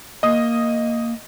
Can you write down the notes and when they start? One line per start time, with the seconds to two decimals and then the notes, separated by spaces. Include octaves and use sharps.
0.23 A#3 D#5 D#6